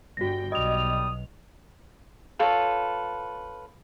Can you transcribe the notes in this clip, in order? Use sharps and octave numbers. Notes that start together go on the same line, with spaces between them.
G1 G2 F#4 G5 A#6
B1 G3 D#5 D#6 F7
F4 A4 B4 C#5